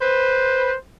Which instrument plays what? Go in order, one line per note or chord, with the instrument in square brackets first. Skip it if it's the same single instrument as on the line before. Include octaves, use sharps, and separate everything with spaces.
[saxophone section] B4 C5